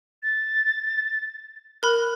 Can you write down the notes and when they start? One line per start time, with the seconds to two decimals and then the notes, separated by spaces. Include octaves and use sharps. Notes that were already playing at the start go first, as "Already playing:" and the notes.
0.23 A6
1.83 A#4 B5 F#6